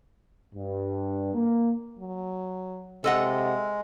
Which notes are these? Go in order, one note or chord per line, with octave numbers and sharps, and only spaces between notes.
G2
A#3
F#3
C3 G#3 A4 D#5 F#5